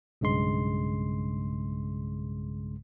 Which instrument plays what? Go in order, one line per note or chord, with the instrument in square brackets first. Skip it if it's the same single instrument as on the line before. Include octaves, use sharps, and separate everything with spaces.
[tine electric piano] B1 G2 C#3 G#3 C6